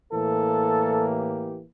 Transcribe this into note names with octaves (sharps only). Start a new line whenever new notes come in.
A2 E3 A#3 A4
G4